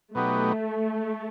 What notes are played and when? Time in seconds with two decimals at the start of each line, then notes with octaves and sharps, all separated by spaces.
0.15 B2 F#3 A3 B3 D#4 G4